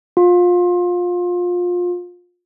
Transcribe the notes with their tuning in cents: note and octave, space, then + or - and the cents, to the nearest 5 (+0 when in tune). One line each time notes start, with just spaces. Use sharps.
F4 +25